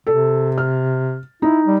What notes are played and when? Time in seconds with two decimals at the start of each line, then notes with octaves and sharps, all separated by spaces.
0.07 C3 A4
0.58 F6
1.42 D#4 E4
1.66 G3